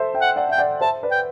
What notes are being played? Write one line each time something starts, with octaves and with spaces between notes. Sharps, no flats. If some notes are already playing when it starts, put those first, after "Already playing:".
Already playing: A4 C5 E5
E5 G5
F#5
D5 F#5
E5 G5
D5 F#5
C5 E5 A5
B4 D5
G5